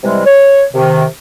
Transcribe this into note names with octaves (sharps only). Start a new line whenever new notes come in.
C3 E3 G3 G#3
C#5
C3 D#3